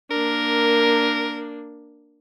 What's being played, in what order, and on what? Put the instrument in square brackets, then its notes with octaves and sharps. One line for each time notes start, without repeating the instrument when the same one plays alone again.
[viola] A#3 D4 [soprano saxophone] A#4